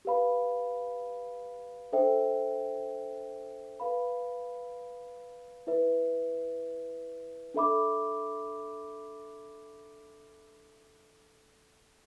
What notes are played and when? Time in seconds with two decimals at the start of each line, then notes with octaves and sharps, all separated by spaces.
0.05 G4 B4 F5 B5
1.93 D4 A4 C5 E5 G5
3.80 B4 F5 B5
5.67 E4 B4 E5
7.54 D4 A4 E5 B5 D6